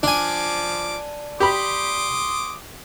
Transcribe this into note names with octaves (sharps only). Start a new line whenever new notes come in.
F3 D4 G#5 D6
G4 B5 C6 D6 D#6